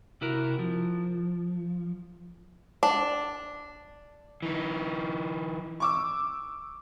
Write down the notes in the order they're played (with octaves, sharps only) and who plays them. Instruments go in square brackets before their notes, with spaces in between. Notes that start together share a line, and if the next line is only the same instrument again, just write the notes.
[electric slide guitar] C3 E4 F#4 A#4
F3
[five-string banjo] D4
[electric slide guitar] E3 D#4
[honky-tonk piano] C#6 D6 E6